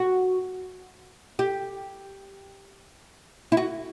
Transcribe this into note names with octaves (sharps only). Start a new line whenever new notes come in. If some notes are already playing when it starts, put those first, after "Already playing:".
Already playing: F#4
G4
E4
F#4